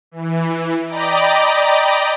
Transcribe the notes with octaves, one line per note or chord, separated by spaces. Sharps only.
E3
D5 D#5 G5 A#5 B5 D6